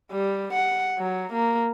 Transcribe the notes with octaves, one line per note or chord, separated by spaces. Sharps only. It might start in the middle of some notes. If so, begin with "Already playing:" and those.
G3
F#5
F#3
A#3